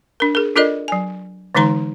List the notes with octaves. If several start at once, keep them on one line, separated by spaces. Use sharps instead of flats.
D4 A#4
G#4 A#4
D4 F4 A4 A#4 D5 D#5
F#3 G#5
D3 E3 G#3 D#4 A#5 C6